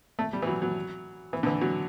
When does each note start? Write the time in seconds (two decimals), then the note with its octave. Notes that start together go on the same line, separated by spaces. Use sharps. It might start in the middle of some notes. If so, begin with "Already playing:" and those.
0.19 A3
0.33 G3
0.42 E3
0.47 F#3
0.62 F#3
1.33 E3
1.43 D3
1.46 E3
1.61 F#3